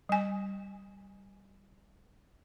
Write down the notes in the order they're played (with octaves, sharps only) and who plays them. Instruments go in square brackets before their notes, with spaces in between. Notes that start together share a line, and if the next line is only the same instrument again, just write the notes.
[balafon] G3 G#5